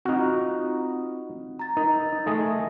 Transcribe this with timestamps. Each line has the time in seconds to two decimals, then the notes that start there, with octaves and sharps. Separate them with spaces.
0.05 C4 D#4 F4 F#4
1.59 A#5 A6
1.77 D#4 A#4
2.26 A3 G#4 D#5